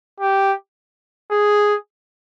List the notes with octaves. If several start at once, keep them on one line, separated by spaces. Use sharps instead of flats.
G4
G#4